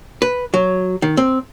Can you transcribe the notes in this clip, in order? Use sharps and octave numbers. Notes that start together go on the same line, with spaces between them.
B4
F#3
D#3
C4